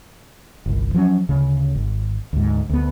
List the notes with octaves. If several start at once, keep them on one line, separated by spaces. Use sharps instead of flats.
G1 C2
F3 F#3 A#3 C#4
D2 C#3
G#1
D2 G#2
D2 B3